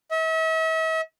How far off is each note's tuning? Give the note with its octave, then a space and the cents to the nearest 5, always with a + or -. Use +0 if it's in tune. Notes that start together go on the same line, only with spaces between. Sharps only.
E5 -40